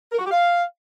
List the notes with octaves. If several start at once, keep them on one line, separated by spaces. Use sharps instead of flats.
A#4
F#4
G4
F5